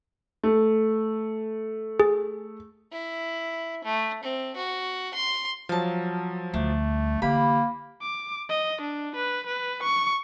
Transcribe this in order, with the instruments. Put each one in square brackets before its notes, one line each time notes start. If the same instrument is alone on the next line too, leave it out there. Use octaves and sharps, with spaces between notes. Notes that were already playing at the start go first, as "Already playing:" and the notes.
[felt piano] A3
[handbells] G#4
[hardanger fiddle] E4
A3
C4
F#4
C6
[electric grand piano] F3 F#3 [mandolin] F5 A5
[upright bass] D2 G3 [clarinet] A3 [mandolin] D4
[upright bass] D3 E3 [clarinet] A#3 [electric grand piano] G4 [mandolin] B5
[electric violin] D6
D#5
D4
B4
B4
C#6